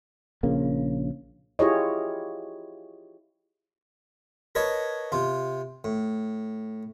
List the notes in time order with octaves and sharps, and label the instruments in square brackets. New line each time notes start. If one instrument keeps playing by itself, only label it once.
[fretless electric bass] A#1 C#3 A#3
[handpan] E4 F4 G4 G#4 C#5 D#5
[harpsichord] A#4 B4 C#5 D#5 A5
C3 F4
A2